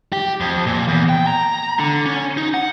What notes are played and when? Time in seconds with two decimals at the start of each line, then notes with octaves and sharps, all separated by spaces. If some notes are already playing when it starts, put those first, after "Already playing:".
0.13 G4
0.41 F2
0.66 A#2
0.88 E2
1.09 G5
1.27 A#5
1.79 D3
2.06 C#4
2.37 D#4
2.54 F#5